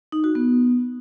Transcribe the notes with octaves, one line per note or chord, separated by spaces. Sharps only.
D#4
F#4
B3